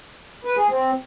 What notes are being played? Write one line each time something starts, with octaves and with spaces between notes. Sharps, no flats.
B4
G#4
C4